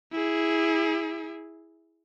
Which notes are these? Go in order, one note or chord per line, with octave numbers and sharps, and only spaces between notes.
E4 G#4